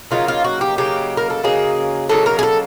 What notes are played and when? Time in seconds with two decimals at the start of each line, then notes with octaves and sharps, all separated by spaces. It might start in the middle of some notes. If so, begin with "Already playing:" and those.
0.11 C#3 F#3 A#3 D#4 F4
0.28 F4
0.44 F#4
0.61 G4
0.78 C#3 F#3 A#3 D#4 G4
1.17 A#4
1.30 A4
1.43 C#3 F#3 A#3 D#4 G#4
2.09 C#3 F#3 A#3 D#4 A4
2.26 A#4
2.39 G#4
2.43 A4